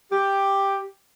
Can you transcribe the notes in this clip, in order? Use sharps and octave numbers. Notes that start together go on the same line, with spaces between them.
G4